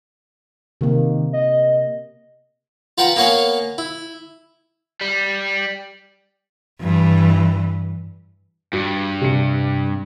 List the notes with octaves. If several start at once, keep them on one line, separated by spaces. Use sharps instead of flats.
C3 D#3 A#3
D#5
F4 B4 F#5 G5 A#5
A#3 B3 C#5 F5 G#5
E4
G3
G2 E3
G2 F#4
C3 C#7